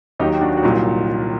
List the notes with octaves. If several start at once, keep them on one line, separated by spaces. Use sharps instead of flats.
D#2 D#3 F#3 D#4 G4
D4 F#4
F#4
C2 A#2 F#3 D#4 G4